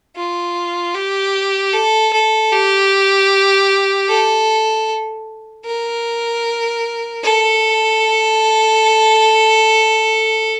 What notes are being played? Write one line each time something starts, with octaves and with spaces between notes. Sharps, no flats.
F4
G4
A4
A4
G4
A4
A#4
A4